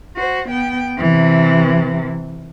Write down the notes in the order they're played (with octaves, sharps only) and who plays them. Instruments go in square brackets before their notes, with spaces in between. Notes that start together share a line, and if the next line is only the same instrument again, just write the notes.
[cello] F#4 C5
B3 G5
C3 E3